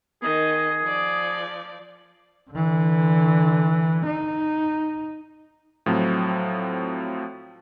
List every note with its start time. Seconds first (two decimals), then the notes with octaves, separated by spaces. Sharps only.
0.23 D#3 G#4 D#5
0.83 F3 D5
2.51 D3 E3
4.06 D#4
5.86 A2 F3 F#3 C4